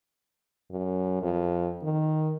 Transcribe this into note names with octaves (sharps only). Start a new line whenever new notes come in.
F#2
F2
D#3